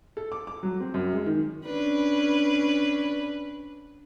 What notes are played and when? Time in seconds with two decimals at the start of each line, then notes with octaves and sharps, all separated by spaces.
0.17 A4
0.32 D6
0.47 D6
0.63 F#3
0.80 C4
0.94 F#2
1.13 G#3
1.26 D#3
1.65 C#4 D4 B4